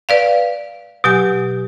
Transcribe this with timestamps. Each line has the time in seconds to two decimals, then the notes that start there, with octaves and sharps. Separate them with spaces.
0.09 B4 D5 F5
1.04 B2 F#3 G4 G#5